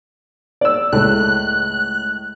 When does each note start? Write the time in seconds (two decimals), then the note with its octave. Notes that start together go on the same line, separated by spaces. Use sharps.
0.61 D5 E6
0.93 C#2 A2 A3 F#6